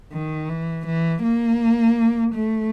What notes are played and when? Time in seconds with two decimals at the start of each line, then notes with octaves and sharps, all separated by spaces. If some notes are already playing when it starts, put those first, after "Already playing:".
0.13 D#3
0.49 E3
0.86 E3
1.23 A#3
2.35 A3